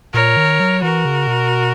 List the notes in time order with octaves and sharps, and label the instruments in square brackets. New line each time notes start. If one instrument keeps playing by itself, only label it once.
[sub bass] A#2 [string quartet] A#4 C#5
[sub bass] D#3
F#3
[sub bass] E3 [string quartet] F#4 A#4
[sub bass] C#3
B2